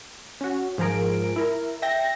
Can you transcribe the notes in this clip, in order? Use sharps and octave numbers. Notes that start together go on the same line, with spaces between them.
C#4 F#4
G#2 F3 G#4 A#4 D7
E4 A#4
E5 G5 A#6